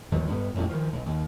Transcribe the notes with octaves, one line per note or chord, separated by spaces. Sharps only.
G1 D#2 F3 F#3
G2 B3
A1 F2 G#2
D#3 F3
B1
D#2